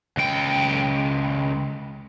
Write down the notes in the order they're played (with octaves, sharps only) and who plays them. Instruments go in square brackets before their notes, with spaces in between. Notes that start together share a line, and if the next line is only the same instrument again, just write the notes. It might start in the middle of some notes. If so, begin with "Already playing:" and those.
[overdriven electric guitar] C#2 G5